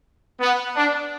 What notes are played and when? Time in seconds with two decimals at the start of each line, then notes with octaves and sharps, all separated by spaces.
0.40 B3
0.76 D4